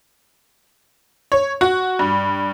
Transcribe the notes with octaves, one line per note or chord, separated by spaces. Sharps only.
C#5
F#4
G2